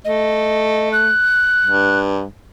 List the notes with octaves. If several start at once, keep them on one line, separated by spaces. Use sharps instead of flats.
A3 D#5
F#6
G2